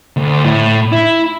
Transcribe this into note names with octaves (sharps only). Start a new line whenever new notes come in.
D2
A2
E4